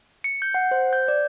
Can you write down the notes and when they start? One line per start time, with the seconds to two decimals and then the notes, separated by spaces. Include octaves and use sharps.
0.24 C#7
0.42 G6
0.54 F#5
0.71 C5
0.93 G6
1.08 D5